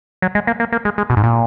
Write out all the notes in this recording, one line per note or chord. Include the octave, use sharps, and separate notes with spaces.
F#3
G#3
A#3
A#3
A#3
G#3
G#3
B2
G#2
A#2